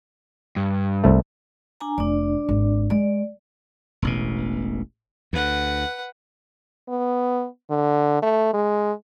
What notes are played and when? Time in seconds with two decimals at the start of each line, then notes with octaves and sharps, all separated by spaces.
0.56 G2
1.04 C2 A3
1.80 D4 G#5 A#5
1.98 F1 D4 D5
2.49 G#1
2.90 G#3 D5
4.02 E1 A1 B2
5.33 D2 B4 F#5
6.89 B3
7.70 D3
8.22 A3
8.53 G#3